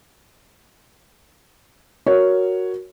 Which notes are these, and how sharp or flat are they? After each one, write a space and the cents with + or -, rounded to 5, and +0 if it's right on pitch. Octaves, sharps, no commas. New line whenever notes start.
F#4 +0 A#4 +0 C#5 +5